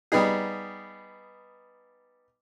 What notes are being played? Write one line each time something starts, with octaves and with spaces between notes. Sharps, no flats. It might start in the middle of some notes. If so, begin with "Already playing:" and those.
G3 B3 D#4 G#4